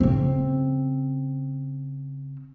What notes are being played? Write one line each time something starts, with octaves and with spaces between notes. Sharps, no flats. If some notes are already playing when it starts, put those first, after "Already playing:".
C#3 C4